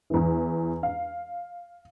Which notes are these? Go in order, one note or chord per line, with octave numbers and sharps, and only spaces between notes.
E2 E3
F5